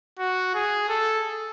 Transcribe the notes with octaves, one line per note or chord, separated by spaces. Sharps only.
F#4
G#4
A4